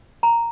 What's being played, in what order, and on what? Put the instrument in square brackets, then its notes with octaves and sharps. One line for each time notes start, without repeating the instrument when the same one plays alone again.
[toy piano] A#5